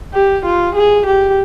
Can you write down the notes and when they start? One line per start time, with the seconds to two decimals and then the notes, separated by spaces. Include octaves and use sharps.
0.14 G4
0.45 F4
0.75 G#4
1.06 G4